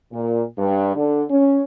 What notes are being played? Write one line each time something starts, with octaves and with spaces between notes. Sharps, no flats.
A#2
G2
D3
C#4